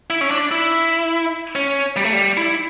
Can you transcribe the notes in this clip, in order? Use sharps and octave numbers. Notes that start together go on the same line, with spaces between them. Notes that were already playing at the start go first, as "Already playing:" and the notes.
E4
C#4
D4
E4
C#4
G3
A3
G3
E4